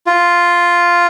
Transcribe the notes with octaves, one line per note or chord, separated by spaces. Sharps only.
F4